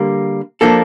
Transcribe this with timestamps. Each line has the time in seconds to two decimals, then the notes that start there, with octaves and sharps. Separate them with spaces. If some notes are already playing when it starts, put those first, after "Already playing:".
Already playing: D3 G3 A#3
0.61 F3 A#3 D4 A4